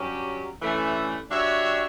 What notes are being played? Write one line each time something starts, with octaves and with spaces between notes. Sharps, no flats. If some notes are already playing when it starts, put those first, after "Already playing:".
Already playing: G2 F#3 C#4 G4
G2 E3 A3 C#4
G3 D4 F#4 C#5 E5